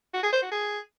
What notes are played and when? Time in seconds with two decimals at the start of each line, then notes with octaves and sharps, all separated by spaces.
0.14 F#4
0.23 G#4
0.33 C5
0.42 F#4
0.52 G#4